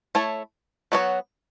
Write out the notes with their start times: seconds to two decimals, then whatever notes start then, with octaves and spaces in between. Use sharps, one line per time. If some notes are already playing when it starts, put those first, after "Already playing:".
0.15 A3 E4 A4 C#5
0.92 F#3 B3 F#4 A4 C#5